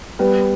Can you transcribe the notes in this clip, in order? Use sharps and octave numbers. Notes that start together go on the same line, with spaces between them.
G3 B3